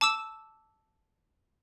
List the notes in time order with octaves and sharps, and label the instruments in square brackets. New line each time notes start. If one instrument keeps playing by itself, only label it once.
[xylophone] A5 D6 E6 E7